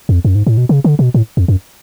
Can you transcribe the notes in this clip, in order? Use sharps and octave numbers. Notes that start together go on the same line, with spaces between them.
F2
F#2
G#2
A2
B2
C#3
D3
B2
A2
F2
F#2